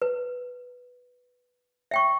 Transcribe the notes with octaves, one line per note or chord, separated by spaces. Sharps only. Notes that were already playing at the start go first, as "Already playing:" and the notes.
B4
E5 G5 C#6